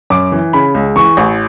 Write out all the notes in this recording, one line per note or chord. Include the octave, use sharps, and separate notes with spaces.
F#2 D6
E3
C#3 B5
C#2
E3 C#6
A1